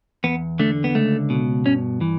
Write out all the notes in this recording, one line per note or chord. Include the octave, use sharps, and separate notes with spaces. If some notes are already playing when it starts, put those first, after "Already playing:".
E2 B3
D3 A3
B3
C#2 A3
B2
G2 C#4
E3